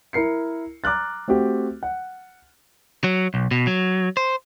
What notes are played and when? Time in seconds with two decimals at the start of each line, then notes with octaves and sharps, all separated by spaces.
0.13 E4 A#4 C7 C#7
0.84 A#5 D6 F6 F#6 A6
1.28 A3 C4 F#4 G4
1.83 F#5
3.04 F#3
3.34 B1
3.51 B2
3.67 F#3
4.17 C5